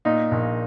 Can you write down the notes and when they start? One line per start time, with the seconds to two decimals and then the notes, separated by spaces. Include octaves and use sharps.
0.05 A#2 D#4
0.31 A#1